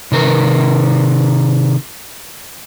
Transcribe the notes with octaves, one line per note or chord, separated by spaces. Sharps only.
C3 D#3 A#4 B4